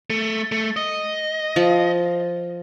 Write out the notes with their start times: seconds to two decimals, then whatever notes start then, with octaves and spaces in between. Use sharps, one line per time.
0.10 A3
0.52 A3
0.77 D#5
1.56 F3